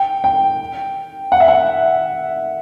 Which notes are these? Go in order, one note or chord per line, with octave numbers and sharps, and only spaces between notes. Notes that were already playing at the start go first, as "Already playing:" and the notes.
Already playing: G5
G5
F#5
E5
F#5